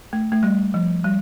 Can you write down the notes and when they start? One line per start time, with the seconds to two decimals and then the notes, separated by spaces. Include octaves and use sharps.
0.13 A3
0.32 A3
0.43 G3
0.74 F3
1.05 G3